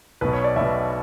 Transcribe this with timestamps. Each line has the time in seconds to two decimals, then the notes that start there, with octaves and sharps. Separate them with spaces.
0.21 B1 B2 B4
0.33 C#5
0.44 D5
0.56 B1 B2 E5